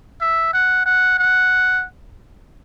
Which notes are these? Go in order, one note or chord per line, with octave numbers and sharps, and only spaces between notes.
E5
F#5
F#5
F#5